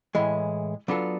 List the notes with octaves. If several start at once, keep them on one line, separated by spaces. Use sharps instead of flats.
A2 E3 G#3
F#3 B3 D4 F4 A4